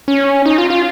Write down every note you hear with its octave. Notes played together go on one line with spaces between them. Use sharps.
C#4
D#4
F4
F4